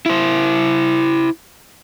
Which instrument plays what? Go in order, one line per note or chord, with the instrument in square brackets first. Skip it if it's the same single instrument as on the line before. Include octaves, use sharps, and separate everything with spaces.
[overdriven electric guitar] E4 C5